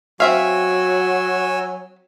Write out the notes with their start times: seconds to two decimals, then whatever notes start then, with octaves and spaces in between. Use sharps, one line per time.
0.20 F#3 C4 F#4 E5 F5 G#5 E6